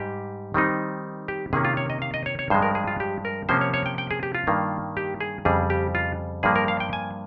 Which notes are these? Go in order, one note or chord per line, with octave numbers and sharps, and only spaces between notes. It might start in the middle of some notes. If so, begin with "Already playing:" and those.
Already playing: G#2 G3 G4
D#3 G3 C4 D#4
G4
C3 D#3 A#3 C#4 G#4
F4
C#5
D#5
F5
D#5
C#5
C#5
G2 F3 G#3 C5
A#4
G#4
F4
G4
A#4
C3 F3 A#3 C#4 C5
C#5
C#5
G5
G5
G#4
G4
F4
G2 D#3 A#3
G4
G#4
F2 C#3 G3 G#4
G4
F4
G2 F3 A#3 G#4
A#4
F5
G5
G#5